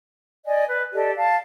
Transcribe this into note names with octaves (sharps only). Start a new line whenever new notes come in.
D5 D#5 G#5
B4
G4 A4 D5 D#5
F5 A5